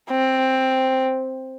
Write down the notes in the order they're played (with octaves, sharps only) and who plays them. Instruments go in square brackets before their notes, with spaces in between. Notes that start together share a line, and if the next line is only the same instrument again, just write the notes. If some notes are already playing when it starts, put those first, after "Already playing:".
[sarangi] C4